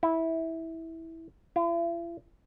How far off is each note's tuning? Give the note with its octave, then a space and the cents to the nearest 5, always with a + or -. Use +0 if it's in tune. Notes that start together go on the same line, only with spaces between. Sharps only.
E4 -15
E4 +45